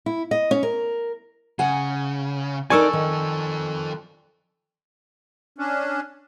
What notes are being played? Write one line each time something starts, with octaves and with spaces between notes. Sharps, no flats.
E4
D#5
C#4
A#4
C#3 F#5 G#5
F3 D#4 A4 A#4 D5 G#5 C#6 E6
D#3
C#4 D4